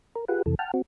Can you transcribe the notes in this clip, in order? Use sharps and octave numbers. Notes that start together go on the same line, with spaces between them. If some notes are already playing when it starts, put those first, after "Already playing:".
A#4
F4 G4 G#4 B4 F#5
F2 C3 E3 A4
F#5 G5 A5 F6
C4 F#4